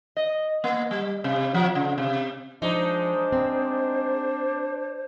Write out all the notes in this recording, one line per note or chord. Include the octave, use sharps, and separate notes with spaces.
D#5
A#3
G3
C3
F3
C#3
C3
F3 G#3 D4 D#4 C5
C4